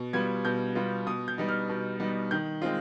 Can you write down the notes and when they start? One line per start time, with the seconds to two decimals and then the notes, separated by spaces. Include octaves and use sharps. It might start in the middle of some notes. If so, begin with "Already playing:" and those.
Already playing: B2
0.13 G3 B3 F4 G#6
0.45 B2 G6
0.75 G3 B3 F4
1.06 B2 D#6
1.28 G6
1.38 G3 B3 D#4
1.48 F6
1.69 B2
2.00 G3 B3 D#4
2.31 D#3 G6
2.62 G#3 C4 F4